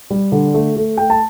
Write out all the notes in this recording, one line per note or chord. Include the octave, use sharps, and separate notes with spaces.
G3
D3
A3
A3
A3 G5
A5